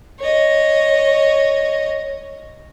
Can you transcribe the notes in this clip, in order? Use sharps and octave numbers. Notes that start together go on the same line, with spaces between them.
C#5 D#5